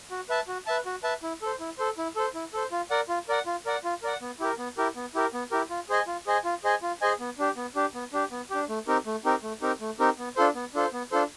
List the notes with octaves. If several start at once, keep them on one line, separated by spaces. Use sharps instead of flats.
F#4
B4 E5 A5
F#4
B4 E5 A5
F#4
B4 E5 A5
E4
A4 C5
E4
A4 C5
E4
A4 C5
E4
A4 C5
F4
A#4 D5 F#5
F4
A#4 D5 F#5
F4
A#4 D5 F#5
F4
A#4 D5 F#5
B3
E4 G4 A#4
B3
E4 G4 A#4
B3
E4 G4 A#4
B3
E4 G4 A#4
F4
G#4 C5 D#5 G#5
F4
G#4 C5 D#5 G#5
F4
G#4 C5 D#5 G#5
F4
G#4 C5 D#5 G#5
B3
D4 G4
B3
D4 G4
B3
D4 G4
B3
D4 G4
A3
C4 D#4 G4 A#4
A3
C4 D#4 G4 A#4
A3
C4 D#4 G4 A#4
A3
C4 D#4 G4 A#4
B3
D4 F4 A4 C5
B3
D4 F4 A4 C5
B3
D4 F4 A4 C5